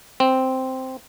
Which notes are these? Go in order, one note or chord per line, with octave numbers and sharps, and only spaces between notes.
C4